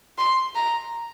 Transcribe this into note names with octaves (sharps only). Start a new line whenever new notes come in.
C6
A#5